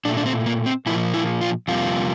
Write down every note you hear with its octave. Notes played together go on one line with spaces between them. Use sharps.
A#2 A3 D4
D4
C4
A#3
C4
A#2 F3 A#3 E4
E4
F4
F2 C3 G3 A#3 F4